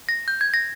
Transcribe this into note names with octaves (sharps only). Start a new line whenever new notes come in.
A#6
G6
G#6
A#6